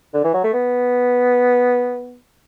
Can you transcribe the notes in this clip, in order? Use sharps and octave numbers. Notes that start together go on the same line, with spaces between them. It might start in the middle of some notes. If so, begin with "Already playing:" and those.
D3
E3
F#3
A3
B3